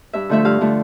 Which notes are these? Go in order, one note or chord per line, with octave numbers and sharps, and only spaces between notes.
G2 E5
D3 F3 A3 E5
G2 F5
D3 F3 A3